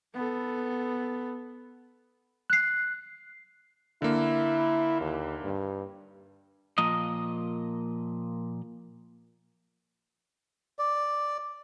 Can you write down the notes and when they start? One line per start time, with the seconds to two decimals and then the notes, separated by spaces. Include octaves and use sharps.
0.14 B3 A4
2.50 F#6 C7
4.02 D3 A#3 E4
5.01 D#2
5.44 G2
6.78 A#2 F3 A#3 D#5
10.79 D5